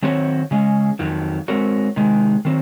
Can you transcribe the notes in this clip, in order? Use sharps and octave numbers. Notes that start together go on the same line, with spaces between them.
D#3 F#3 C4 F#4 C#5
C#3 G#3 C#4
F2 D#3 F#3
G#3 C4 F#4 A#4 C#5
C3 D#3 G#3
D#3 F#3 C4